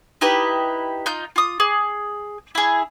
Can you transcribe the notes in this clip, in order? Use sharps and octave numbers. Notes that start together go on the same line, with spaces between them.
D#4 E4 G4 B4
D#4 F4 G6
F4 D#6
G#4
E4 G#4